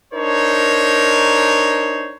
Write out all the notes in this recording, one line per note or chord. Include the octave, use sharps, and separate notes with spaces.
D4 D#4 A#4 C5 C#5